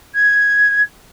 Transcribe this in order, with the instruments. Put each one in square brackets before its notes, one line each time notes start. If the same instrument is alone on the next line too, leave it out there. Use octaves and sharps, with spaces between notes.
[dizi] G#6